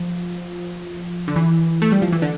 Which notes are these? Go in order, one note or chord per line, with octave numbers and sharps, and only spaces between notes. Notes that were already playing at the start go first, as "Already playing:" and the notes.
Already playing: F3
D3
E3
A3
G3
F3
E3
D3